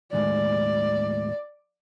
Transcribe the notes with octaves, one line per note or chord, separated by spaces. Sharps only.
D#2 A2 G#3 D5